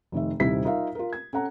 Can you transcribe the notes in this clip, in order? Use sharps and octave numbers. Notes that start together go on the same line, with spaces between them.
F1 D#3 E5
D#1 C3 D#3 E4 B6
D#4 F4 A#4 E5 F5
F4 A#4
G#6
C#4 A4 F#5 A#5